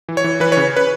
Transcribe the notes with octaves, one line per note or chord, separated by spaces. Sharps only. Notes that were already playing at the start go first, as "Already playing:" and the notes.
E3
C#5
E3
E3 B4
C#3 C#5
B4